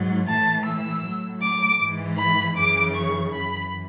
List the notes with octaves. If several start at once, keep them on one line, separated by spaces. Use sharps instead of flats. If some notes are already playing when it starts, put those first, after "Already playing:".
Already playing: G#2 F#3
A2 E3 A5
E6
A2 F#3
D6
G#2 E3
B5
F#2 C#3 E3 D6
C#6
F#2 E3 B5